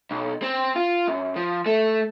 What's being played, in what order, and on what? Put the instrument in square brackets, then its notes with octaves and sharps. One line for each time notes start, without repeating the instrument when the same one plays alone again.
[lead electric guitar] B1
C4
F4
F#2
F3
A3